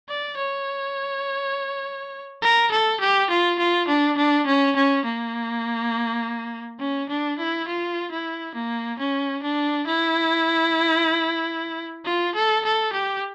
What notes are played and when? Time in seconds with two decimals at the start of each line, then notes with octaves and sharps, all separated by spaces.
0.09 D5
0.37 C#5
2.42 A#4
2.71 A4
3.00 G4
3.30 F4
3.59 F4
3.88 D4
4.17 D4
4.46 C#4
4.76 C#4
5.05 A#3
6.80 C#4
7.09 D4
7.39 E4
7.68 F4
8.11 E4
8.55 A#3
8.99 C#4
9.43 D4
9.87 E4
12.05 F4
12.35 A4
12.65 A4
12.93 G4